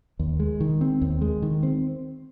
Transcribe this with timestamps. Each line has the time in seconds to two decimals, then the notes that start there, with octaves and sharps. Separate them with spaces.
0.19 D#2
0.40 G#3
0.60 D#3
0.81 C4
1.01 D#2
1.22 G#3
1.42 D#3
1.63 C4